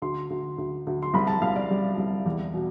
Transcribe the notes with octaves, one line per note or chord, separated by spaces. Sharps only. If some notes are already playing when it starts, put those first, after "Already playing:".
D2 C6
D2
D2
D2
C6
C2 B5
A5
C2 F5
D5
G3
C2
E2
B2